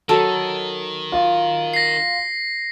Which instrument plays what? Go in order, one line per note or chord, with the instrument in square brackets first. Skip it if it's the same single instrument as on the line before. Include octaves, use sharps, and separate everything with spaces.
[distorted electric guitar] D#3 [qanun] F#3 A4
[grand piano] F4
[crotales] A#6 C7